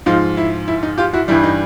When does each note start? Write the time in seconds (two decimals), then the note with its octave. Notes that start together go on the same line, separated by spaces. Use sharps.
0.06 G#2 F3 D#4 F4
0.37 E4
0.68 E4
0.83 D#4
0.98 F4 G4
1.13 E4 F#4
1.28 G2 E3 G3 E4
1.44 D#4